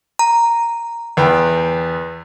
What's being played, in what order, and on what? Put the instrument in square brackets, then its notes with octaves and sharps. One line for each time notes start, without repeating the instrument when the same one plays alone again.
[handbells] A#5
[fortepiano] E2 B3 G5